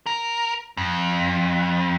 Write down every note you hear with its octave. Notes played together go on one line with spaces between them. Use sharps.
A#4
F2